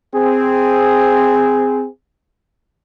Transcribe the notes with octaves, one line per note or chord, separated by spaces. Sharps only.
C4 G#4